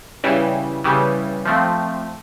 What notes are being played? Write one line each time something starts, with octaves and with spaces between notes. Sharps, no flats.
C#3 E3 G3
C#3 E3 G3
F3 A3 C4